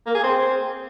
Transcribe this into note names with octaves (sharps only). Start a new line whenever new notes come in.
A#3
G#4
C4